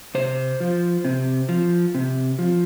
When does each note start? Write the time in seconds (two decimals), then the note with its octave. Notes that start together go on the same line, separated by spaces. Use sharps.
0.15 C3 C5
0.60 F3
1.04 C3
1.49 F3
1.95 C3
2.39 F3